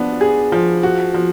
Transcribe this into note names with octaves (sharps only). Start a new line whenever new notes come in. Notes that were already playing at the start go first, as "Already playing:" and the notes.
Already playing: F3 B3 D4
G#4
F3
F#4
F3